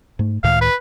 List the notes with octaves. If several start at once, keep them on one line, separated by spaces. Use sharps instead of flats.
G#2 A3
C#2 A2 D#3 F5
B4